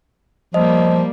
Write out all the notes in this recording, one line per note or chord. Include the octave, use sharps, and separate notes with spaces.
F3 G3 A#3 D#5